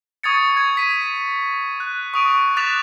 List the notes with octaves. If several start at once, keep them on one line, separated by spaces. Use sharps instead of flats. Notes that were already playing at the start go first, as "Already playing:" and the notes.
C#6 D#6 G#6 A6 C#7
C#6 G#6
B6 D#7
F#6
C#6 D#6 D7
D6 F#6 A6 B6 E7 F7